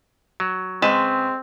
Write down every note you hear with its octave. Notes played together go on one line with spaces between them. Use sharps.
F#3
C#3 G#3 C4 B4 A5